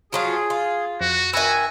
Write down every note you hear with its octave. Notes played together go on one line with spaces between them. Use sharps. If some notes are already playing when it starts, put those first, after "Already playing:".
F3 F#3 F4 G#4
F4
F2 F#4
D#3 F#4 B4 E5 G#5 E6